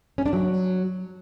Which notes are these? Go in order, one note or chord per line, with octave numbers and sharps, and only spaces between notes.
C#4
D4
F#3